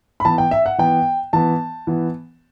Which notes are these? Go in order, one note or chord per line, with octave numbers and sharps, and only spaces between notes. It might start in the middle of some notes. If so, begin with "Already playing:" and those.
B5
E3 B3 A5
G5
E5
F#5
E3 B3 G5
E3 B3 A5
E3 B3